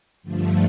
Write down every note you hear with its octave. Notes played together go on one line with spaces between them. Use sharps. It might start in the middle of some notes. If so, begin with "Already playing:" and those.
G2 D3 F3 A3